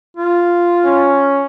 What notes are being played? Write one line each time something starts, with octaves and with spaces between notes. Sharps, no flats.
F4
C#4